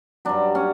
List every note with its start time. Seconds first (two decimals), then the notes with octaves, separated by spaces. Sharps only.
0.25 G2 F#3 D4
0.55 C#4